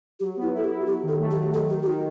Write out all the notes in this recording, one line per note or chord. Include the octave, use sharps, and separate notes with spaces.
F#3 G4
B3
E4
E4 A4
G4
E4
F#4
F#3 G4
D#3
A4
A3
G4
F#3
D#3 A4
D#3 G4
G4
D#3 F#4